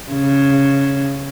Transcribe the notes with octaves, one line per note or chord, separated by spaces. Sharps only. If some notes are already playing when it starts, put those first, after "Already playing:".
C#3